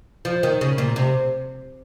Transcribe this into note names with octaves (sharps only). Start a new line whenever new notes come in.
F3
D#3
C#3
A#2
C3